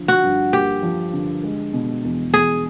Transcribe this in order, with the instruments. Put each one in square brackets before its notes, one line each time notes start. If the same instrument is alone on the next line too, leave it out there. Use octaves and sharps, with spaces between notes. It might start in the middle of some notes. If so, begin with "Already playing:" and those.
Already playing: [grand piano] D3 F3
[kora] F#4
[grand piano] G2
[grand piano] A#3 [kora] G4
[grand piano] F3
D3
G#3
B2
E2
[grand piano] E2 [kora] G#4